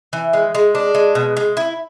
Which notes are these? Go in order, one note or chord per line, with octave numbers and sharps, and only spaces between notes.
E3
G#3
G#3
D4
G#3
B2
G#3
E4